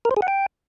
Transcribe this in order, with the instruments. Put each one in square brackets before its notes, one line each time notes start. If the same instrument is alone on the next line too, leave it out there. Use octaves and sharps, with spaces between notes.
[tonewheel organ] A#4
C5
G#4
F#5
G5